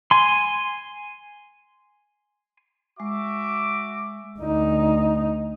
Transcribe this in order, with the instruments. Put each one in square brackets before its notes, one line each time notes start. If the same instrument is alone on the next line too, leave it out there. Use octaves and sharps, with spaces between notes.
[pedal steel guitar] G#5 C6
[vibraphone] G#3 [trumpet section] F#4 E5 D6
[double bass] D2 D#4